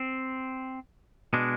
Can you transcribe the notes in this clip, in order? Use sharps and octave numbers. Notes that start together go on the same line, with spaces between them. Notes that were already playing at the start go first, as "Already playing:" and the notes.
Already playing: C4
B2 G#3 D4